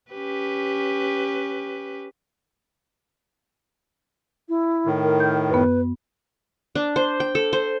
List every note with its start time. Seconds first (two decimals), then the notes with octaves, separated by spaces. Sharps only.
0.12 C#4 G4 B4
4.49 E4
4.86 A2 D#3
5.04 A#4
5.20 G6
5.50 F#2 B3 B4
6.75 D4
6.96 C5
7.20 G5
7.35 A4
7.53 C5